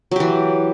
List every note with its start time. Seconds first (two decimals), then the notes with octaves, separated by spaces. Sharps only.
0.11 F#3
0.16 G4
0.20 E3